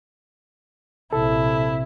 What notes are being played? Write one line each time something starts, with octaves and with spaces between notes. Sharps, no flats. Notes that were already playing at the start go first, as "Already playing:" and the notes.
A#1 C3 E4 A4